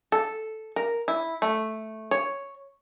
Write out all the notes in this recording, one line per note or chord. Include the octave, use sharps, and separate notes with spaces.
A4
A#4
E4
A3
C#5